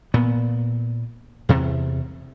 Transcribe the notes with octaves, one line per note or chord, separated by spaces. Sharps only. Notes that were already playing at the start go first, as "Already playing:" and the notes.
A#2 B3
E2 C3